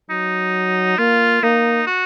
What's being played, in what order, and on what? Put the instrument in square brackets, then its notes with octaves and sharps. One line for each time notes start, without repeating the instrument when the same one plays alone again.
[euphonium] F#3 [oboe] D#4
[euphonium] A#3 [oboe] F4
[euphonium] A#3 [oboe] D#4
[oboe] F#4